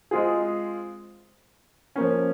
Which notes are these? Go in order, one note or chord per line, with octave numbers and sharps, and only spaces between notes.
G#3 C4 F4 G#4
F3 A#3 C#4